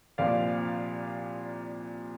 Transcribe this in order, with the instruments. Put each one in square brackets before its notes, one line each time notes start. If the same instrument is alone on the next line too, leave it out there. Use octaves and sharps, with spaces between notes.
[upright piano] C2 A#2 F3 D5 F5